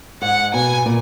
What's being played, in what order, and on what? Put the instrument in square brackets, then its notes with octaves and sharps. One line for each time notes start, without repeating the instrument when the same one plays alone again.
[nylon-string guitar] G#2 [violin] F#5
[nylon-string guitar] B2 [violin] G#5
[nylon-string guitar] A#2